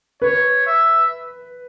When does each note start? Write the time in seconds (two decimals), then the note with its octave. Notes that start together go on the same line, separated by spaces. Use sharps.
0.22 B4 C#5
0.66 E5